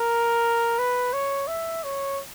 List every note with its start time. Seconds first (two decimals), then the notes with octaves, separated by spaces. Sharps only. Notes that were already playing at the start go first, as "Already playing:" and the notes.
Already playing: A#4
0.79 B4
1.13 C#5
1.48 E5
1.83 C#5